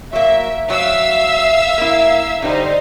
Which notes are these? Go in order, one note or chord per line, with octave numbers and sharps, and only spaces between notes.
F#3 A#3 E5
F#3 E5 F5 E6
A#3 E4
D3 G3 D#4 C5